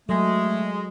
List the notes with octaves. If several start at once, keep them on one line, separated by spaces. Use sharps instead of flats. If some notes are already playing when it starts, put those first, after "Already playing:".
F#3 G#3 A3 A4